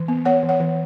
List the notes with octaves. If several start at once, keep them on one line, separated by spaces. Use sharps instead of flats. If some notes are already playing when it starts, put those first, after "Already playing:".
Already playing: E3
B3
B3 C#5 F#5
E3
C#5 F#5
E3